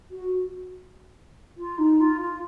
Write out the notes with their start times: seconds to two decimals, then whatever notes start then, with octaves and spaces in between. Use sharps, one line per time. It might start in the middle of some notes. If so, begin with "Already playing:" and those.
0.11 F#4
1.57 F4
1.78 D#4
2.00 F4
2.20 F4